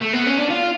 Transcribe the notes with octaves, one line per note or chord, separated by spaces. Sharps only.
A3
B3
C#4
D4
F4